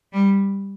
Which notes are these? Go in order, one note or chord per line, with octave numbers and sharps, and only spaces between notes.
G3